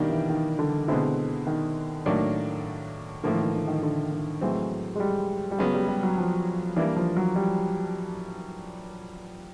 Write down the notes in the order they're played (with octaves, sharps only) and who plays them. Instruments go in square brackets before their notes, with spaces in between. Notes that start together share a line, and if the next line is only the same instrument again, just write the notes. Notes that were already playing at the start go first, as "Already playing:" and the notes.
Already playing: [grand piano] B2 G3 A#3 D4 G4 [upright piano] D#3
[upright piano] E3
D#3
D3
[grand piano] B2 G#3 C4 E4 [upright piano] D3
[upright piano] D#3
[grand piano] A2 F#3 A#3 D4 [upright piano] D#3
[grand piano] A2 F3 A#3 [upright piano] D3
[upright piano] E3
D#3
D3
D#3
D3
D#3
[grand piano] A2 E3 G#3 C4 [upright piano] F#3
[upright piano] G#3
G3
G3
[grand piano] C#3 F#3 B3 [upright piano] G#3
[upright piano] G3
G3
F#3
F3
[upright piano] E3 [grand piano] G3 A#3 D4
[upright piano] F3
F#3
G3